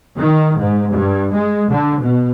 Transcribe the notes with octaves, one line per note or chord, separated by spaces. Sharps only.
D#3
G#2
G2
G#3
D3
B2